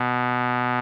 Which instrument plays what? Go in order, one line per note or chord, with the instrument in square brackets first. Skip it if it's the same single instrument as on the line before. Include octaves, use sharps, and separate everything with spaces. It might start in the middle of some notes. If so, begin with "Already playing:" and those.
Already playing: [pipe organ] B2